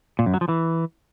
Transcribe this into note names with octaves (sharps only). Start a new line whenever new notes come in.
A#2
F#2
F#3
F3
E3